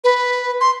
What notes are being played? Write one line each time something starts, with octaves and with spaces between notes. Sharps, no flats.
B4
C6